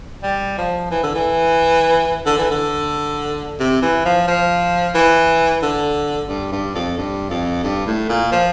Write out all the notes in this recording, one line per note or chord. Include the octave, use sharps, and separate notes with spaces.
G3
F3
E3
D3
E3
D3
E3
D3
C3
E3
F3
F3
E3
D3
G2
G2
F2
G2
F2
G2
A2
A#2
F3